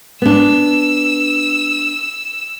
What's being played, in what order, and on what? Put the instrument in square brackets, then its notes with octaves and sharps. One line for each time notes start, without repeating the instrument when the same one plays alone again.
[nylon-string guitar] B3 D4 [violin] E6